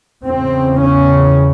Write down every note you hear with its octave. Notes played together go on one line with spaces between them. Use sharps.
E2 C#3 C4
C#4